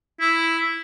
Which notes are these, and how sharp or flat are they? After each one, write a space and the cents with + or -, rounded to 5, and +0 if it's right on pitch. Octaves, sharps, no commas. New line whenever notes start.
E4 +0